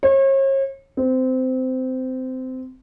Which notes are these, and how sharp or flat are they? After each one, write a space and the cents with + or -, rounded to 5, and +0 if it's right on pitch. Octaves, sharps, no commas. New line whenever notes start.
C#5 -40
C4 -20